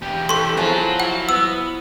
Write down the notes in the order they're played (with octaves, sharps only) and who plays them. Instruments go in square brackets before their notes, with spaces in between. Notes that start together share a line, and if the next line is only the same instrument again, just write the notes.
[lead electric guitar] E2 G4
[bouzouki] E3 A4 [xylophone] C6 C#6
[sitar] F3 [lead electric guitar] F#3 F#4 [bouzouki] E4 G#4
[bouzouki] E4 [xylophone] F#5
[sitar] B3 [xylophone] E6